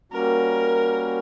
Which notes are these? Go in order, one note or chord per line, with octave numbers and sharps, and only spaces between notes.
G3 A#3 C#4 F#4 A#4